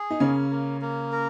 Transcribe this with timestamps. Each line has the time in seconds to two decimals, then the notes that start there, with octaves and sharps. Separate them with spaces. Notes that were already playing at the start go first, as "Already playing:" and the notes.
Already playing: G#4
0.11 D#4
0.20 C#3 A#3 C#4
0.51 A#3
0.81 A#3
1.12 A#4